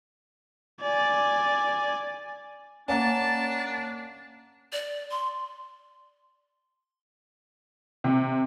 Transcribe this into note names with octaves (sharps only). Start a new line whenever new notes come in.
D5 G#5
A#3 C#4 D4 D5 F#5 A5 A#5
D5
C6
C3